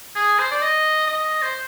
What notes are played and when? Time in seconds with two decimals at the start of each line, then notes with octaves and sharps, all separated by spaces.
0.16 G#4
0.39 C5
0.51 D5
0.62 D#5
1.07 D#5
1.42 C5